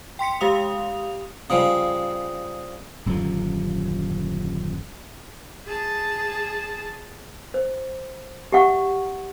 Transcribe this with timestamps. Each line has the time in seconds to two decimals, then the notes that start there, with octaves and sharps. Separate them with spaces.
0.19 G5 C6 B6 C#7
0.41 G#3 G4 F5 D#6 F7
1.50 C#3 F3 G3 D#6
3.06 D#1 F#2 D3 F3
5.66 G#4 A5
7.54 C5
8.52 G4 E5 F#5 C#6